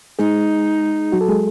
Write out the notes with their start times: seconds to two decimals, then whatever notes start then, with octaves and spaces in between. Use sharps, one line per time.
0.19 G#3 D#4 G#4
1.12 F#3 F#4
1.21 A4
1.29 G#3 G#4